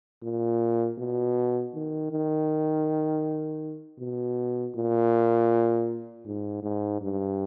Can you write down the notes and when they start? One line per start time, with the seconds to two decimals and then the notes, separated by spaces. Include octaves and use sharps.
0.23 A#2
0.98 B2
1.74 D#3
2.12 D#3
4.00 B2
4.75 A#2
6.25 G#2
6.63 G#2
7.02 G2